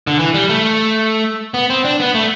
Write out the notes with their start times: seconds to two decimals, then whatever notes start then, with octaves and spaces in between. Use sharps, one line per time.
0.07 D3
0.19 E3
0.34 G3
0.49 A3
1.54 B3
1.70 C4
1.85 D4
2.00 B3
2.15 A3